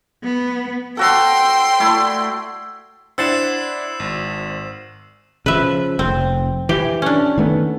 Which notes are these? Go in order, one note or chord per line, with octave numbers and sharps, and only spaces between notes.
B3
F#4 A4 G5 C6
A3 E4 D5
D4 E4 C5 F#5 E6 A6 C7 E7
G#1
C#3 F3 B4 E5
F1 C4
E3 G4
C#4 D4
D#3 A3 B3